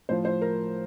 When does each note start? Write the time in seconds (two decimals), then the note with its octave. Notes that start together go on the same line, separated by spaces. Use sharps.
0.09 A2 F3 C5
0.25 C5
0.41 A#4